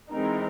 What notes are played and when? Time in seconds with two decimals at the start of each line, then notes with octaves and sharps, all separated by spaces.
0.11 E3 G#3 C4 D#4 A#4